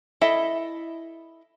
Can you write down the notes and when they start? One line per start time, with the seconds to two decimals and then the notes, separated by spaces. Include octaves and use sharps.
0.21 E4 A4 D#5 E5